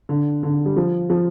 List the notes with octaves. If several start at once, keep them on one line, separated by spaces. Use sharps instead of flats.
D3
D3
G3
F3
F3